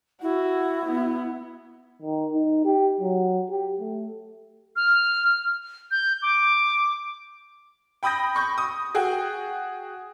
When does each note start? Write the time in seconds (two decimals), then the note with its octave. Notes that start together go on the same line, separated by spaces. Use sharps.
0.22 E4 F#4
0.86 B3
2.02 D#3
2.33 D#4
2.65 G4
3.00 F#3
3.50 G4
3.80 A3
4.76 F6
5.91 G6
6.22 D6
8.03 G5 B5 D#6 G6 A#6
8.35 B5 C#6 G6
8.58 D#6
8.94 F#4 G#4 G5